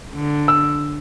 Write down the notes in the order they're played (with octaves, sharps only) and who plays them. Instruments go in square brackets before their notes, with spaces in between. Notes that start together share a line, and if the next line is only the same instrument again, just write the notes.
[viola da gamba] D3
[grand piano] E6